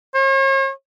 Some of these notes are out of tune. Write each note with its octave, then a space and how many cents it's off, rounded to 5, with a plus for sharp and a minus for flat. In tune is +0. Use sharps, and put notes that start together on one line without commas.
C#5 -45